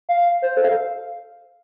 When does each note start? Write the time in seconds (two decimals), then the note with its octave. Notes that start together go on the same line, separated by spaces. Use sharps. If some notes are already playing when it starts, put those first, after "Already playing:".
0.09 F5
0.42 C5
0.57 A4
0.64 F5